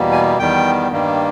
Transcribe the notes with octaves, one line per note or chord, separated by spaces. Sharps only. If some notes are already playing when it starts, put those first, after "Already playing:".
Already playing: E2 B2 G3 A#3
G#5
E2 D#3 G3 G5
G2 D#3 G3 A#3